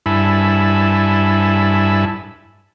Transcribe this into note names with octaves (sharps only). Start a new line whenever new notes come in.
G2 E4 G#5 A5 B5 E6